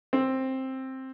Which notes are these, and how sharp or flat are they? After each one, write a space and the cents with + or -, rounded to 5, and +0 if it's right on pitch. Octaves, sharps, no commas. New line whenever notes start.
C4 +10